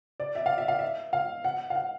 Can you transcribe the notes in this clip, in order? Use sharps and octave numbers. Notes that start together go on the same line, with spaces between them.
D5
E5
F5
E5
F5
E5
F5
F#5
F5
F#5